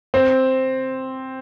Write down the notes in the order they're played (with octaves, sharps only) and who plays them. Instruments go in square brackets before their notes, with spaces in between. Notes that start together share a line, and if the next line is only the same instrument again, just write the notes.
[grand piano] C4